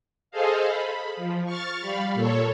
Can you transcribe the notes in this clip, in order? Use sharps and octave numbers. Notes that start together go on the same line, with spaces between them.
G#4 A4 C5 D#5 F5
B5
F3
C#6 F6 A6
G3 F5 B5
A#2 A4 C#5